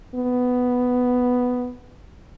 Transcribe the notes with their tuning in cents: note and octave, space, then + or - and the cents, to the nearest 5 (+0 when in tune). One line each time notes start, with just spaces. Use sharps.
B3 +5